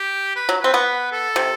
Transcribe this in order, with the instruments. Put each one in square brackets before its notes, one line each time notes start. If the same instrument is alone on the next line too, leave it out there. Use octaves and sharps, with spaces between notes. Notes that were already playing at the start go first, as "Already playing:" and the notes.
Already playing: [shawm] G4
B4
[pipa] F#3
[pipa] C4 [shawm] B4
[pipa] B3
[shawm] A4
[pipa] C3